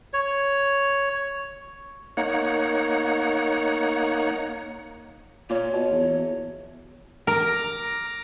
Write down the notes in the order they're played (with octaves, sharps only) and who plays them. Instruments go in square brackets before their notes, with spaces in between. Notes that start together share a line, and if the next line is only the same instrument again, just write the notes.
[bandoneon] C#5
[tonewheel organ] A#3 D#4 C#5 F#5
[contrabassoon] A#2 [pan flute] C#5
[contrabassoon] B2
E2
[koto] A#4 [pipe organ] A#5 D6 F6